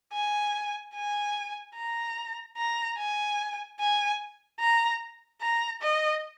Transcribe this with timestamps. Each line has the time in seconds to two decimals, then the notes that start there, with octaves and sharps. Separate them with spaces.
0.13 G#5
0.95 G#5
1.76 A#5
2.57 A#5
2.98 G#5
3.80 G#5
4.60 A#5
5.42 A#5
5.82 D#5